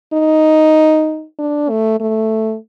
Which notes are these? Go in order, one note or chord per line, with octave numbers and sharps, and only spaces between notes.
D#4
D4
A3
A3